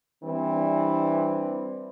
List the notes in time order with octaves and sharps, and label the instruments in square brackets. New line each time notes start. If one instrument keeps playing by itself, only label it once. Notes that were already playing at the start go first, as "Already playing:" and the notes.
[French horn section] E3 G3 C4 D4